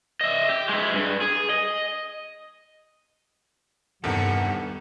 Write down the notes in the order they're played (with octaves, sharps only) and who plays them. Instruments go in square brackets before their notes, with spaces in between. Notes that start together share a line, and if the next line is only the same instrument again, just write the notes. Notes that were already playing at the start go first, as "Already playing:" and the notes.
[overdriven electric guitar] D#5 E5
G4
G#3 E4
G2
G#4
D#5
[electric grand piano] E2 C3 D#3 [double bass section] G2 [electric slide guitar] B3 D4 A4 [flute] F#5